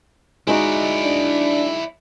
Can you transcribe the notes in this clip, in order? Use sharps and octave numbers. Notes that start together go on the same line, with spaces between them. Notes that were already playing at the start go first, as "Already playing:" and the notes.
G#3 D#4 E4 F#4 D5
D4